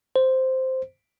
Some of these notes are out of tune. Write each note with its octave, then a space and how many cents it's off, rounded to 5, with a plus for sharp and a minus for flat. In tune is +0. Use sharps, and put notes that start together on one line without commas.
C5 -5